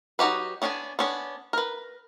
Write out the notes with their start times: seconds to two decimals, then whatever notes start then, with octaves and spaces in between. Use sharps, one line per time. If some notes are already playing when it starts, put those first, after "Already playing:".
0.19 F#3 D#4 F#4 G4 B4
0.62 B3 C#4 D4 D#5 G#5
0.99 B3 C#4 D4
1.53 A#4 B4